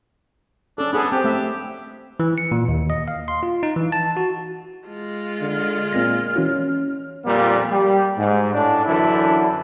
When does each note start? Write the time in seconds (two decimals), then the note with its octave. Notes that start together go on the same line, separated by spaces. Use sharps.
0.78 C#4 D4 A4
0.93 B3 D4 G#4 A4
1.12 C4 G4
1.24 A3 E5
2.20 E3
2.38 C#7
2.52 A#2
2.68 D#2
2.90 D#5
3.08 F5
3.28 C6
3.43 F4
3.63 D#4
3.76 E3
3.92 A5
4.17 F#4
4.87 G#3 F4
5.41 D3 F6
5.92 A#2 C4 A#6
6.36 E3 C#4 E4 F#4
7.25 F2 A#2 G3 A#3
7.71 G3
8.17 G#2
8.54 A2 D4
8.86 F#2 D3 E3 D4 E4